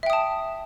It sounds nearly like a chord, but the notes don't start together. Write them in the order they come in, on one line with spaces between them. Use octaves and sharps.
E5 G5 D#6 A5